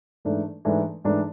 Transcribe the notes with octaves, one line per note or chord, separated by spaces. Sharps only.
G#2 E3 A3 D4
G#2 E3 A3 D4
G#2 E3 A3 D4